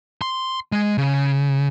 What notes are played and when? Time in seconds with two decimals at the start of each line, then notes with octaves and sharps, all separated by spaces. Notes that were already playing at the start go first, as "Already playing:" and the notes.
0.22 C6
0.72 G#3
0.98 C#3